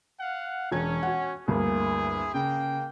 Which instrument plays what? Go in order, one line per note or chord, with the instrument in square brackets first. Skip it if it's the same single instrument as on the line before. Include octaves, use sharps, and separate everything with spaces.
[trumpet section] F5 F#5
[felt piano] E1 G#6 [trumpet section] C#4
[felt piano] F#4 F#5
[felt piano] D2 G2 A#3 [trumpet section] E4 G#4
[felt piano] C#3 [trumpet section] A#3 G5